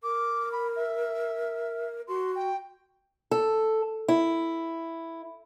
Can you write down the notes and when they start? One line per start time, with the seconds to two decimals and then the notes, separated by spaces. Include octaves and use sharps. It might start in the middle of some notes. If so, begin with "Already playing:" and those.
0.03 A#4 D6
0.52 B5
0.76 E5
2.08 F#4 C6
2.35 G5
3.31 A4
4.08 E4